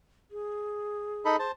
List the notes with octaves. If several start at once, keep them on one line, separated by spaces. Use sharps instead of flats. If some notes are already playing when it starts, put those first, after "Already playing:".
G#4
D#4 A4 B5
C5 A5